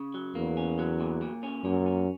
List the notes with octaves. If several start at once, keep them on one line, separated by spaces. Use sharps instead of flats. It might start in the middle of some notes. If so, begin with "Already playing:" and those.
Already playing: C#3
F#3
E2 A#3
C#4
F#3
A#2
A#2
C#4
F#2 A#2
C#4